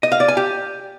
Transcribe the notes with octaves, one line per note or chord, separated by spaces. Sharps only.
D#5
F5
D5
G#5
G4